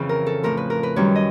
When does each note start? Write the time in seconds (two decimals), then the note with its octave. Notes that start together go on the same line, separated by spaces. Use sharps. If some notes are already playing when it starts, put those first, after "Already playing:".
Already playing: F2 C#3 E3
0.09 A#4
0.26 A4
0.43 A2 F3 A#4
0.57 B4
0.70 A#4
0.83 B4
0.96 F#2 D#3 G3 C#5
1.15 D#5